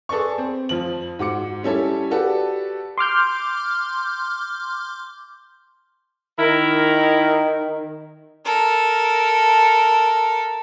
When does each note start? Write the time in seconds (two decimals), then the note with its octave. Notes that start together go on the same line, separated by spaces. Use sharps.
0.09 G#4 A4 B4 D5 C#6
0.38 C4
0.69 F2 F3 F#7
1.19 G#2 F#4 D6 C#7
1.63 G3 C#4 E4 A4 C#5
2.11 F#4 G4 A4 B4 D5
2.98 C6 D6 F6 G6
6.39 D#3 E4 A#4
8.45 A4 A#4